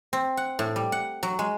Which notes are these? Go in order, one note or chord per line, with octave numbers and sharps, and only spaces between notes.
C4
F#5
A2
G3
F#5
F#3
G#3